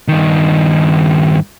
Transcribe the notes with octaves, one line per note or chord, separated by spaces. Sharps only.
G2 D#3